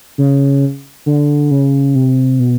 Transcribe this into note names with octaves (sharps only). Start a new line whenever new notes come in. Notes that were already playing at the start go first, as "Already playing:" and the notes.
C#3
D3
C#3
C3
B2